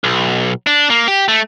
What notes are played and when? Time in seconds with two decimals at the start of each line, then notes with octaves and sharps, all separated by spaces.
0.04 B1
0.67 D4
0.90 A#3
1.08 G4
1.28 A3